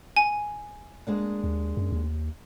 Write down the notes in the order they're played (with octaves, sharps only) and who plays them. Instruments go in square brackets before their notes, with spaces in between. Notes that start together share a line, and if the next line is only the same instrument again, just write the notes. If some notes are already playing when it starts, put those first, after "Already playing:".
[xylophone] G#5
[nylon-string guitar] G#3 A#3 D4
[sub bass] D#2
F#2
D#2